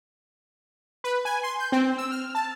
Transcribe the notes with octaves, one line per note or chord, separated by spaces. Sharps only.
B4
G#5
C6
G6
C4
E6
F6
A5